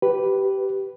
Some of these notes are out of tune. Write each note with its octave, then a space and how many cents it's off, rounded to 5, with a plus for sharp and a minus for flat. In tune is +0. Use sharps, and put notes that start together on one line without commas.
G4 -15 B4 +0